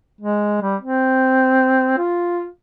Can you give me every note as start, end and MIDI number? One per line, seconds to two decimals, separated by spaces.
0.21 0.60 56
0.62 0.76 55
0.81 1.97 60
1.98 2.47 65